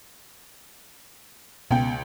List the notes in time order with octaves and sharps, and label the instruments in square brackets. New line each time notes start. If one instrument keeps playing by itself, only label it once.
[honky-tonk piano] C#2 G5 [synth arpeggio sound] B2 [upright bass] B3